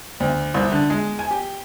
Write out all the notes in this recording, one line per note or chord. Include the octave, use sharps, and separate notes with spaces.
D2
C2
D3
G#3
G#5
G4